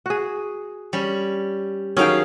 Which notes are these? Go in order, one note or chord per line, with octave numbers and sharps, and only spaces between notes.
F#4 G#4
G3 C#4
D#3 F#3 C#4 G#4 F5 G5